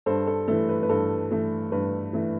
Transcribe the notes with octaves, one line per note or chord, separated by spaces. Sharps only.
G2 A4 C5
A4
E3 A3 A4
B4
B4
G2 A4
E3 A3
G2 B4
E3 A3